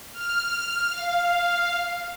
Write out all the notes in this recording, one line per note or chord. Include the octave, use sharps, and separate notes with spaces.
F6
F5